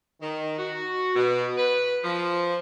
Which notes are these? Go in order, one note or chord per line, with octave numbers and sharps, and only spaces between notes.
D#3
F#4
B2
B4
F3